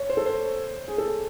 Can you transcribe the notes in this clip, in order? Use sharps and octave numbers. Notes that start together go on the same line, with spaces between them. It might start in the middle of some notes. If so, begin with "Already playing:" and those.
Already playing: C#5
C5
A4
C5
G#4
A4